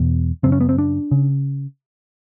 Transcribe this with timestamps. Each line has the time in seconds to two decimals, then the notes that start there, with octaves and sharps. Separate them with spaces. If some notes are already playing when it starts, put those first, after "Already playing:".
Already playing: E2 B2
0.43 F#2 C#3 C4
0.52 C#4
0.61 B3
0.69 C4
0.78 D4
1.11 C#3